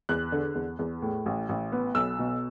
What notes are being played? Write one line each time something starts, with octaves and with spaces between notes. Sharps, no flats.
E2 F#6
D3
E2
E2
A2
A1
A1
B3
B1 E6
B2